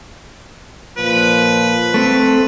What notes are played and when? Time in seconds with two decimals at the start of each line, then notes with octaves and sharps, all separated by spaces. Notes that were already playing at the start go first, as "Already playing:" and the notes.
0.97 A#2 F3 B4
1.94 A3 C4